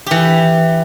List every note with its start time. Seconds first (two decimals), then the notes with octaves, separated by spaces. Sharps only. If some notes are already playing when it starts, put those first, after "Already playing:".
0.07 E3 G4